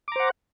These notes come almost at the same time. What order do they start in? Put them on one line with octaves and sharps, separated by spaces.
D6 A#5 C5 F#5